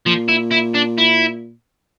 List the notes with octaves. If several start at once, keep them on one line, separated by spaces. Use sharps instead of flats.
A#2 F3
E4
E4
D4
E4